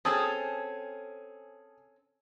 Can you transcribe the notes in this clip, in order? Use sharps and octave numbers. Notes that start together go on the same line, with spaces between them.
C4 C#4 G#4 A4 A5 D#6